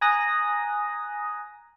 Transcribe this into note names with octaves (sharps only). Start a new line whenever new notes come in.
G#5 A#5 D#6 F#6 A#6